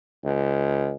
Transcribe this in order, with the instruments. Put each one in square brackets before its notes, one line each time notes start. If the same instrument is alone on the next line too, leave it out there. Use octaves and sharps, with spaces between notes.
[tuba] C#2